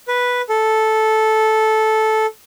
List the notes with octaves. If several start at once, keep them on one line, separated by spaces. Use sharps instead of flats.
B4
A4